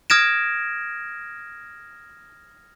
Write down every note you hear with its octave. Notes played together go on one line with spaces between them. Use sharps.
D#6 F6 G#6 A#6 D7 E7